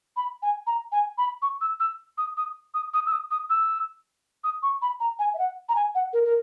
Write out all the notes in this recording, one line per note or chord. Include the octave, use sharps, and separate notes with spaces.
B5
G#5
A#5
G#5
B5
C#6
E6
E6
D#6
D#6
D#6
D#6
E6
D#6
D#6
E6
D#6
C#6
B5
A#5
G#5
E5
F#5
A#5
G#5
F#5
A#4
A#4